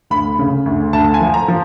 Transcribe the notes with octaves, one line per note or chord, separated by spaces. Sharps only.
D2 B5
C#3
D2
D2 A5
G#5
F3
A#5
F3